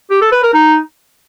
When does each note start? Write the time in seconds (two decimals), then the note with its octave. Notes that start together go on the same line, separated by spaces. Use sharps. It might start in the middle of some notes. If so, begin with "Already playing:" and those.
0.11 G4
0.21 A4
0.32 B4
0.43 A#4
0.54 D#4